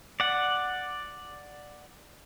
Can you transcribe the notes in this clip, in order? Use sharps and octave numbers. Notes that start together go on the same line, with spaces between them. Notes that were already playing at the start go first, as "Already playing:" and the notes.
D5 F#5